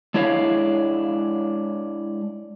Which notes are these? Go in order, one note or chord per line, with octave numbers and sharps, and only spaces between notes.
G#3 D4 E4 C#5 D#5 F5